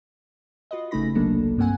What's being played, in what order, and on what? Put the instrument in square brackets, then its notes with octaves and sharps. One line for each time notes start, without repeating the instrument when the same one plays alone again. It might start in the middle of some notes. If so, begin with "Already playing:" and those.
[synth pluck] F4 F#4 B4 D#5
G1 C#3 A3 D#4 B5 A#6
G1 C2 F#3 A#3 D4 A4
G2 A#3 C4 F#5 G#5